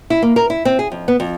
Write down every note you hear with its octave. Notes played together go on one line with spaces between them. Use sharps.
E4
A#3
A#4
E4
C4
G#4
F2
B3
F2